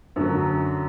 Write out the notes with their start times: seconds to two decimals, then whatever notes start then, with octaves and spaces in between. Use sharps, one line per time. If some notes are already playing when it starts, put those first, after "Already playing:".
0.16 F#2 D3 F#3